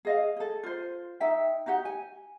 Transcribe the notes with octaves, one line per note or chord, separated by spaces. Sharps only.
G#4 D#5 F5
G#4 A4
F4 C5
D#4 E5 G5
D#4 F#4 G4 F#5
G#5